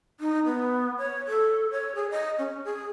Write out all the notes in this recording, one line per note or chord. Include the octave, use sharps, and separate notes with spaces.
D#4
B3
C#5
A4
C#5
G#4
D#5
C#4
G#4